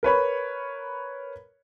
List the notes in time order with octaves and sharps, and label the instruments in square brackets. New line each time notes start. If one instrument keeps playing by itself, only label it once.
[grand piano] A#4 B4 C#5 B5